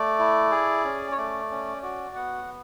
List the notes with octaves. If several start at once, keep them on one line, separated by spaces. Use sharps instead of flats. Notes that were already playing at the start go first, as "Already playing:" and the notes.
Already playing: A3 D5
E4
G#4
C#4
C#5
A3 D5
C#4
F#4 D5
B3 F#5